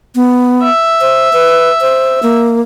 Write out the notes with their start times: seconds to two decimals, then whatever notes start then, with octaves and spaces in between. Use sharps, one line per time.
0.15 B3
0.63 E5
1.01 C5
1.33 B4
1.81 C5
2.23 A#3